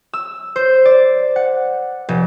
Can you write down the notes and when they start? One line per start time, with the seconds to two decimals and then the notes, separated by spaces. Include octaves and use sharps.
0.13 E6
0.56 C5
0.85 D5
1.36 F#5
2.09 F1